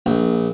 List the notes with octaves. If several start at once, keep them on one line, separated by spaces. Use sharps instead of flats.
A#1